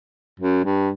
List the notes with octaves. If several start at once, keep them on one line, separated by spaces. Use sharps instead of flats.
F#2
G2